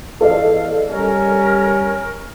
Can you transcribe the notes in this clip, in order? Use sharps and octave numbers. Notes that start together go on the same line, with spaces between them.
E2 A4 D5 D#5 F5
G3 C#4 A#4